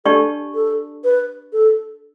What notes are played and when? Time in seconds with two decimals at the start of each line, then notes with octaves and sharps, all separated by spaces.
0.05 D4 G4 A4 D5 A5 C#6
0.55 A4
1.04 B4
1.53 A4